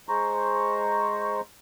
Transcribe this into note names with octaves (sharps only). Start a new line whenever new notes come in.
G#3 C5 A#5 C#6